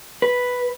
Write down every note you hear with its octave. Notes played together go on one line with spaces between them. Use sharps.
B4